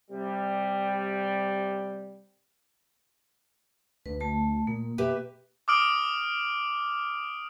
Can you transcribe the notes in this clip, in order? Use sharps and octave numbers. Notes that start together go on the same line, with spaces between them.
C3 G3
D2 B4
A3 A5
A#2 A#3
B2 G4 B4 E5
D6 D#6 F6 D7 F#7